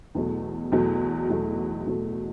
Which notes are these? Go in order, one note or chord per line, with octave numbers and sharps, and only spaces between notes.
E2 B2 F#3 A3
E2 B2 F#3 A3
E2 B2 F#3 A3
E2 B2 F#3 A3